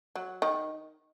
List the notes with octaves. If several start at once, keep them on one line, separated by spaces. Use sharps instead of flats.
F#3
D#3